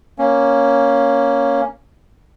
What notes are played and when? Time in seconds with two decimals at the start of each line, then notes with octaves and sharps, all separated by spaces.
0.18 A#3 C#4